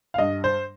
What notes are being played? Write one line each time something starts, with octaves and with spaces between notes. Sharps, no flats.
F5
G2 D#5
C5